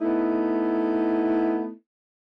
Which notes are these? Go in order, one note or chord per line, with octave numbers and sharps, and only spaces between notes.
A3 B3 D#4 E4